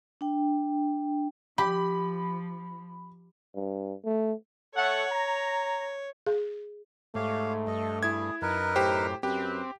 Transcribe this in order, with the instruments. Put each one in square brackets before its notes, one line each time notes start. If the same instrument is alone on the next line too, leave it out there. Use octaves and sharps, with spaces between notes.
[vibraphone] D4 G5
[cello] F3 [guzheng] G4 [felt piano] B5
[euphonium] G2
A3
[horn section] A3 A4 F#5 [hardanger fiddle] C#5
[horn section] A#5
[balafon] G#4
[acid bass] G#2 [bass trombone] A3 [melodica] G4 C#5 F5
[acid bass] G2 [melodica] A4 D#5
[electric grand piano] E4 G#6 [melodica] G#4
[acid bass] F#2 [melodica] D#4 A#4 B4
[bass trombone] A2 [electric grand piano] G4 C5
[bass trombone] F#2 [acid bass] C4 [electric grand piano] G4 [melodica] B4